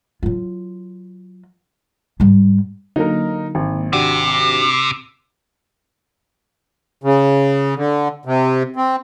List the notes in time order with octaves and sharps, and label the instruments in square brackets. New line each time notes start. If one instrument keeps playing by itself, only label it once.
[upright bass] F#3 F4
G#2 G3
[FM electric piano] D3 F#3 A#3 [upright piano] D#4 A#4
[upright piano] G#1
[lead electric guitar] C3 [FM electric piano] D4 F#4 G4
[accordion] C#3
D3
C3
C4